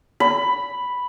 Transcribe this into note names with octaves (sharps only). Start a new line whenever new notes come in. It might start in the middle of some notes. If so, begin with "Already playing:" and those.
B5